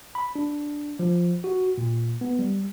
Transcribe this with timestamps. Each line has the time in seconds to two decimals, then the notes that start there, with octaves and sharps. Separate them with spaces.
0.15 B5
0.35 D4
0.99 F3
1.44 F#4
1.78 A#2
2.21 B3
2.39 G3